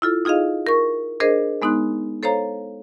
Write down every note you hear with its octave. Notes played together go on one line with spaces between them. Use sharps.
E4 F4 A4
D#4 F4 G#4 D#5 F5
A#4 C#6
D4 G#4 A#4 C5 D#5
G#3 B3 D#4 C6 F#6
A4 C5 C#5 F5 A#5